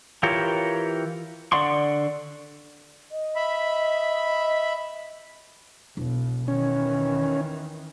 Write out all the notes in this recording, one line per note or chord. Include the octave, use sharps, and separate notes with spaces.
E3 F4 G4 A#4 C#5
D3 D5 F#5 C6 C#6
D#5
E5 B5
E1 B1
D#3 E3 C#4